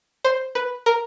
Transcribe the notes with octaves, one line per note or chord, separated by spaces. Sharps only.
C5
B4
A#4